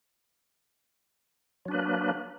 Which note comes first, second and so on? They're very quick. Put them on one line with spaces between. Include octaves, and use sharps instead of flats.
F#3 D4 B4 A#3